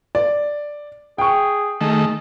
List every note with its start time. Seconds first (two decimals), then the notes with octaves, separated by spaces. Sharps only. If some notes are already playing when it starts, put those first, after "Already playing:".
0.15 D5
1.18 G#4 G5 C#6
1.81 D#3 A3 G#4